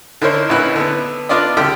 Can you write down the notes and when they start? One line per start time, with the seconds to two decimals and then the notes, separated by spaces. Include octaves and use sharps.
0.22 D3 D#4 E4 A#4 C5 C#5
0.49 A#1 C#4 D#4 E4 B4
0.75 D3 B3
1.29 B3 D4 F4 D5 D#5
1.57 C#2 D3 G4 G5 F6